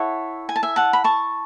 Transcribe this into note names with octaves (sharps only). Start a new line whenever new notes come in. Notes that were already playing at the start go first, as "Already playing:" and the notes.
Already playing: E4 A4 C#5 F#5
G#5
A5
E5 G#5
F#5 A5
B5
A5 C#6